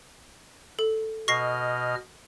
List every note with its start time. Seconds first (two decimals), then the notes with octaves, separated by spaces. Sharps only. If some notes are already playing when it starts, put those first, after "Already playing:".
0.79 A4
1.28 B2 D#5 C#6 F6 A#6 C7